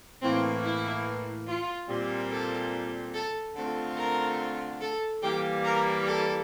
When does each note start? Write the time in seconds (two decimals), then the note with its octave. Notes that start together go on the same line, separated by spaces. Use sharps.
0.22 A2 E3 A#3 C4
0.64 E4
1.47 F4
1.89 A#2 G3 C4
2.31 A4
3.14 A4
3.55 D3 A3 C4 F4 A4
3.97 A#4
4.81 A4
5.22 E3 G3 A#3 G4
5.64 A#4
6.06 A4